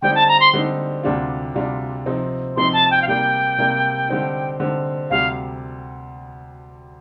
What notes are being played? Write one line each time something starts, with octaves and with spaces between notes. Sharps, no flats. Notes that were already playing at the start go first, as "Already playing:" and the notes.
D3 G3 C4 D#4 G5
A5
A#5
C6
D3 G3 C4 D#4
D2 C3 G3 D4 F4
D2 C3 G3 D4 F4
C3 F3 C4 D#4
C3 F3 C4 D#4 C6
A5
G5
F5
C3 G3 A#3 G5
C3 G3 A#3
D3 G3 C4 D#4
D3 G3 C4 D#4
D2 C3 G3 F5